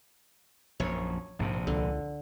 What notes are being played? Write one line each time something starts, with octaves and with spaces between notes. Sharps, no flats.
A#1 F#2 C#5
A#1 G#2 C3
C#2 D3